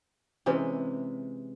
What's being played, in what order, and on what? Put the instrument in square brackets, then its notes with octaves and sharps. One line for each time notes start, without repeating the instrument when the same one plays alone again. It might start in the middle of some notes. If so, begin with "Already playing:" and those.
[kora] C3 E3 G#3 C#4